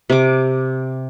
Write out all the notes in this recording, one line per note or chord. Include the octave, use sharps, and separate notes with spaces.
C3 D6